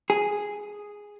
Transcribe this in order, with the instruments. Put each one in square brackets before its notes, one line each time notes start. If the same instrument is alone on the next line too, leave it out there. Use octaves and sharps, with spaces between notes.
[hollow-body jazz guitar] G#4